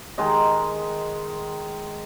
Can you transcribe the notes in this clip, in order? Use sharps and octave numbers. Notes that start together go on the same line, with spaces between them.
D#3 G#3 D#5